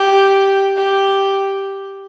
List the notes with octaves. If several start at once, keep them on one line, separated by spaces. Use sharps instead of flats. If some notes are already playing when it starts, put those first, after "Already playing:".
Already playing: G4
G4